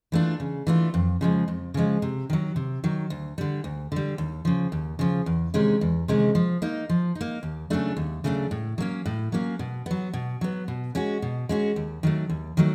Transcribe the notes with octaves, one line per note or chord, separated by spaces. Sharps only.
E3 A3 D4 F4
C#3
E3 A3 D4 F4
F2
C#3 F3 G#3
F2
C#3 F3 G#3
C3
D#3 F#3
C3
D#3 F#3
D2
D3 G3
D2
D3 G3
D#2
C#3 F3
D#2
C#3 F3
E2
C3 D#3 G#3 C#4
E2
C3 D#3 G#3 C#4
F3
A#3 D#4
F3
D#4
A#3
D#2
C#3 F#3 A3 D4
D#2
C#3 F#3 A3 D4
A2
F#3 A#3 C#4
A2
F#3 A#3 C#4
B2
F#3 B3
B2
F#3 B3
B2
G#3 C#4 F#4
B2
G#3 C#4 F#4
D#2
D#3 F#3 A3
D#2
D#3 F#3 A3